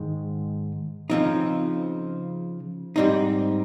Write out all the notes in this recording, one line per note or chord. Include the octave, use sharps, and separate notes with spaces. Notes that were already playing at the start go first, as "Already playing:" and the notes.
Already playing: G#2 D#3 G#3
C#3 F3 C4 D#4
G#2 G3 C4 D#4